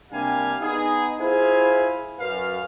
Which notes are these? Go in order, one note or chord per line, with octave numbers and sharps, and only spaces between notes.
C3 G3 A#3 D4 F5 G#5
B3 D#4 G#4
E4 F4 G#4 C5 F5 G#5
F#2 B4 F5